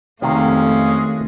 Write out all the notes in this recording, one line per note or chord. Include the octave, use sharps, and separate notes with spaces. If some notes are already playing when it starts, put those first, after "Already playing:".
F2 C3 D#3 G#3 A3 C#4 F#4 F5